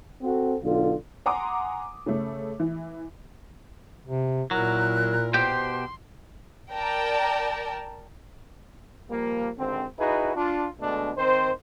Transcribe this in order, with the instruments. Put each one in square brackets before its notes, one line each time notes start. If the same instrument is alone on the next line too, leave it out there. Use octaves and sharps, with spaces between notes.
[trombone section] C4 F#4 A4
B1 D3 F4
[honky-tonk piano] F#5 G#5 A#5 C6 D6 D#6
C#3 A3
E3
[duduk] C3
[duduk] A#2 [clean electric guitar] F#3 [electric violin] E4 A#4 [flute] F#6
[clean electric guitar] B2 G4 G5 [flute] C5 [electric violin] C6
[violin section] A#4 D5 G5 A5
[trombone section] F3 G3 A#3
G#1 D3 C4
D#4 E4 F#4 G#4 B4
D4 F4
B2 D3 G#3 A3 D4
D#3 C4 C5